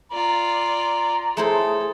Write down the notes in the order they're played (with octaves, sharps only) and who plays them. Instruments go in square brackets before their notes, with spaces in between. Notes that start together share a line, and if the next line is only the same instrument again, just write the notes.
[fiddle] F4 D5 [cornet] A#5
[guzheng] A3 E4 C5 [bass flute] G#4 [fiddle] A4